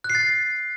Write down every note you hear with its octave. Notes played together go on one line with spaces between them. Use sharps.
F#6
C7
A6